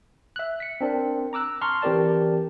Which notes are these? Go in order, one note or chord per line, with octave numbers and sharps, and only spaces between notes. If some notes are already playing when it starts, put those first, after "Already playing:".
E5 F#6
B6 C#7
C4 D4 A#4
A#5 D6 E6 F#6
A5 A#5 C6 C#6 F6
E3 C4 G4 A#4 D5 A5